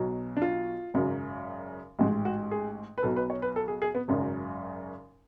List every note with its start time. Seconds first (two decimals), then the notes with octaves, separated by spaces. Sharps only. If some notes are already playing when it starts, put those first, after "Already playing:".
Already playing: B1 B2 F#3
0.37 D4
0.42 F4
0.94 G#1 F#2 C#3 F#3
1.99 A1 G#2 G#3 F#4
2.25 F#4
2.51 G#4
2.98 B4
3.03 B1 B2 F#3 A4
3.16 B4
3.30 C#5
3.42 B4
3.56 A4
3.68 G#4
3.82 G#4
3.95 B3
4.08 G#1 F#2 C#3 F#3